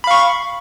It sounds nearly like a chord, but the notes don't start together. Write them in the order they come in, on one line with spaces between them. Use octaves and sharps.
B5 F5 C#6